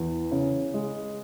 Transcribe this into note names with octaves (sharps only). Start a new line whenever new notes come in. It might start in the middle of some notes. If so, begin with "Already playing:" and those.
Already playing: E2
C#3
G#3